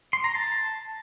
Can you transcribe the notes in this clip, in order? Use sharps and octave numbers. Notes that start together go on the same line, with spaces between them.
C6
A#5
A5